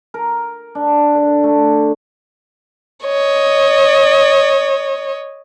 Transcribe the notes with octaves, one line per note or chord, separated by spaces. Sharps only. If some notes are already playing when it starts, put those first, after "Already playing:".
A#4
D4
D3
A3
C#5 D#5